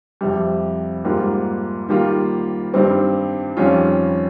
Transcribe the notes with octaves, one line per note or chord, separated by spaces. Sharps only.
F2 C3 G3
G#2 G3 A#3 F4
D#3 G3 A#3 F4
G2 D#3 G3 C4
F2 D#3 G3 C#4 F4